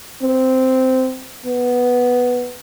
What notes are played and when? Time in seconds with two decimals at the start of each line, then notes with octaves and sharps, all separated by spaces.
0.23 C4
1.46 B3